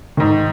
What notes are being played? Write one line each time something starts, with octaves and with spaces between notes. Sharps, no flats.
G#2 D#3